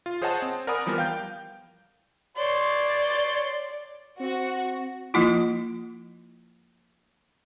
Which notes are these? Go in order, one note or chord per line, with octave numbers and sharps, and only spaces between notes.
F4
G#4 C5 C#5 D#5 F#5 A5
C4
A#4 D5 F#5 G#5 B5 D#6
E3 F3 G3 B3 A#4
F5 G5 G6
C#5 D5 C6
C4 F#4
F3 A#3 E4 F4